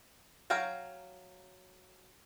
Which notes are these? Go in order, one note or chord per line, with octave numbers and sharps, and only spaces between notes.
F#3 C#5 F5 G5 A#5